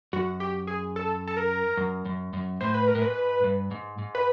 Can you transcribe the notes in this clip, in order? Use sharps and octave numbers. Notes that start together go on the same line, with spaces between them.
F#2 F#4
G4
G#4
A4
A4
A#4
F#2
F#2
F#2
A2 C5
B4
A#4
A2
G#2 B4
G2
G#2
G#2
B4